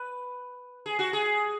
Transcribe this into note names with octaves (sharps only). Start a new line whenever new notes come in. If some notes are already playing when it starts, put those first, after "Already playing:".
Already playing: B4
G#4
F#4
G#4